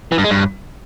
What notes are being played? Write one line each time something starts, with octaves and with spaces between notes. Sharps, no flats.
E3
G2
G#3
G2